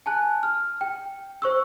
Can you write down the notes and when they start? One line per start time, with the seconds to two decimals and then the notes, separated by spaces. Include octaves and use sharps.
0.06 G#5 A5 F#6
0.43 F6
0.81 G5
1.42 C5 C#6 E6